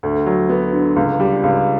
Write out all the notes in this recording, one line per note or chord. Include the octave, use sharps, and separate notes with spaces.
D2
F#3
B3
D3
C#2
G3
C#2